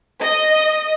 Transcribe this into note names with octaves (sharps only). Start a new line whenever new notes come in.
D#5